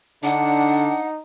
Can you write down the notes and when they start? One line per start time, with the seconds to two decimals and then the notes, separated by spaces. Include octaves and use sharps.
0.23 D3 D4 D#4 F#5